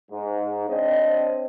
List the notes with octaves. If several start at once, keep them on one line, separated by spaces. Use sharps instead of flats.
G#2
C4 D4 C#5 D#5